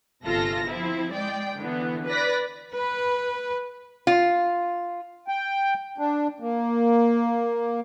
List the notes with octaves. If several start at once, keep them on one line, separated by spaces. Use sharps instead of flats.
G1 C3 F4 A4 A#6
F3 C4 E4
G#3 D5 G5
D3 E3 B3
B4 D5 A#6 B6
B4
F4
G5
D4
A#3